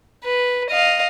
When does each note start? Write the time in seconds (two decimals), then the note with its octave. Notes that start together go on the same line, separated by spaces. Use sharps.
0.24 B4
0.70 D#5 F5